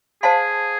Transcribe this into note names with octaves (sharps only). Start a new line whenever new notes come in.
G#4 C5 F5 A5 C6